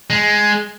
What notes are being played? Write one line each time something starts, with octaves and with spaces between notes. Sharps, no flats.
G#3